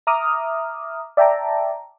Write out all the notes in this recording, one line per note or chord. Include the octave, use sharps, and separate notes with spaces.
E5 A#5 D6 D#6 F6
D5 E5 G5 A5 A#5 D6